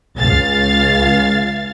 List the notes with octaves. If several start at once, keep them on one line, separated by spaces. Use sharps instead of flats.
C#2 F5 A6